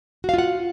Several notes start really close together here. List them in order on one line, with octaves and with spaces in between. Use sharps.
F#4 F5 F4 F#5